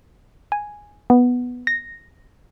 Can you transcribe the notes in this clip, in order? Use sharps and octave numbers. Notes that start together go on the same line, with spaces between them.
G#5
B3
A#6